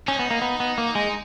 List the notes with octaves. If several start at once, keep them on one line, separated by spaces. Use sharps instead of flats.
C#4 D#4
B3
A#3
B3
B3
A#3
G#3